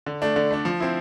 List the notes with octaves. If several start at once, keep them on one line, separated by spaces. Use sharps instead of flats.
D3
A3 D4
D3
A3 D4
F3
C4 E4